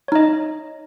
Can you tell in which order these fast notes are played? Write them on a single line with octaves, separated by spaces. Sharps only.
C#5 D#4 D#5